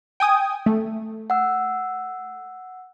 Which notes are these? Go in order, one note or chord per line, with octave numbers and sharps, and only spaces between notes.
G5 G#5 D#6
A3
F#5 E6